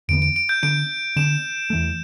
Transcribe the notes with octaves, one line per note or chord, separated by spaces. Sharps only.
E2 D3 B3 D7
D7
D7
G6
D3 B3 D4 D7
D3 B3 D4 E7
E2 E3 A3